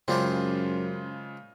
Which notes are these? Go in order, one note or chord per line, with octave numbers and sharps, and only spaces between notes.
F#2 C#3 G#3 C4 D4 E4 F4